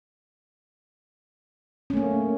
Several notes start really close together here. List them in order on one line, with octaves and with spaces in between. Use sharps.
C#4 A3 A#3